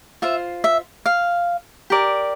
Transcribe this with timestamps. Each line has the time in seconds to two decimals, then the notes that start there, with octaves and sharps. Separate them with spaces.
0.22 F4 C5 E5
0.64 E5
1.06 F5
1.90 G4 A#4 D5